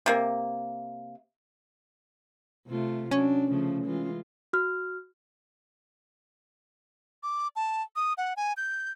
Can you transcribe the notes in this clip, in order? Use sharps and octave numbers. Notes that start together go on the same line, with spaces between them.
C3 A#3
C3 A3 F4
F#3 C#4 D4
C#3 F3 A3
E3 G#3 F4
F#4 F6
D6
A5
D#6
F#5
G#5
G6